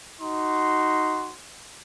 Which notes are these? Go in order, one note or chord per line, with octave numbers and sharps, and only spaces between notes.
D#4 F#4 C6